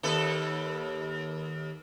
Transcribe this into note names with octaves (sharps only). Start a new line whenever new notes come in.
D#2 A4 B4